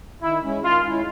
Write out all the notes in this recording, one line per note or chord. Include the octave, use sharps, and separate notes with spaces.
D#3 E4
G#3 C#4 E4
D#3 F4
G#3 C#4 E4